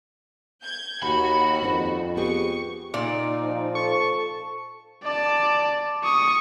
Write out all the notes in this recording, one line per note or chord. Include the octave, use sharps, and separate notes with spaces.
G6 G#6
D#2 F#4 B5
F2 C4 D4 D#4
B3 G4 G#4 C#6
A#2 D#4 D5
F3
A4 C#6
D5 A5
C#6 D#6